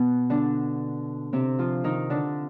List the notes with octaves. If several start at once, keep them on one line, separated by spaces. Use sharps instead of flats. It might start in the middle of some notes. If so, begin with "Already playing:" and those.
Already playing: B2 B3
D3 D4
C3 C4
F3 F4
D#3 D#4
D3 D4